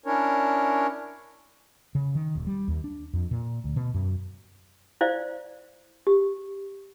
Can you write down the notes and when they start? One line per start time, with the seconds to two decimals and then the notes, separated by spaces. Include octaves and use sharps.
0.06 C#4 D4 E4 A#4 C#5
1.95 C#3
2.15 D#3
2.35 D#1
2.47 G3
2.68 D#2
2.84 D4
3.13 F2
3.31 A#2
3.64 D2
3.76 B2
3.94 F#2
5.01 E4 C5 D5 F5
6.07 G4